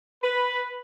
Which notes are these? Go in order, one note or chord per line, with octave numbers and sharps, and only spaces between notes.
B4